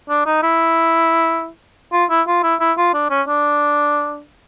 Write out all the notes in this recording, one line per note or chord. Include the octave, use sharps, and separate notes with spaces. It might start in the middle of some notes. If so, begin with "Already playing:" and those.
D4
D#4
E4
F4
E4
F4
E4
E4
F4
D4
C#4
D4